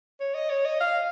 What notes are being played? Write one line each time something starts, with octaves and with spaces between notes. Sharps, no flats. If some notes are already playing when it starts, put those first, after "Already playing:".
C#5
D#5
C#5
D#5
F5